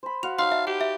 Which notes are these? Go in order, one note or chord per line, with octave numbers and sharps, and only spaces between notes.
C5 B5
F#4 F5 F7
D#4 C#5 F5 C6
E5 A5
G4 F#5
E5